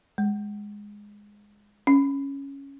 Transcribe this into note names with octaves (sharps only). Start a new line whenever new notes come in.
G#3
C#4